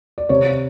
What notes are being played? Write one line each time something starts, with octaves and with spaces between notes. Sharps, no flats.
D5
C3 C#5